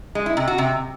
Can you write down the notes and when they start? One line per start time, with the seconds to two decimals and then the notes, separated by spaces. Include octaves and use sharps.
0.15 G#3
0.26 E4
0.37 C3
0.48 F#4
0.58 C3